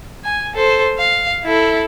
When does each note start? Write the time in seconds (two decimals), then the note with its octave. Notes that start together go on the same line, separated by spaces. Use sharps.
0.24 G#5
0.55 A4 C5
0.98 F5
1.45 E4 A4